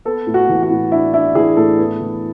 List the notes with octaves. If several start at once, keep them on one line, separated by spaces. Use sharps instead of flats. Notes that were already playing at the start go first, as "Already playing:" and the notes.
B3 A4
A2
F#4
E3
F#4
A2
D4 E4
D4 E4
E3 G#4
A2 A4
B3
E3